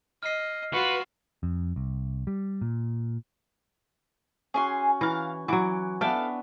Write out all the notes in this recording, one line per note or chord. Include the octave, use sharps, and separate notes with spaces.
D#5 F6 C7
F4 F#4 B4
F2
C2
G3
A#2
C#4 F#4 G#4 G#5 C6
E3 F5 A#5
E3 F#3 F#4 D6
B3 D4 A4 E5 F5 G5